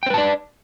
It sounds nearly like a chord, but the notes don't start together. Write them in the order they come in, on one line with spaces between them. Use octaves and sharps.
G5 C5 B4 A5 D5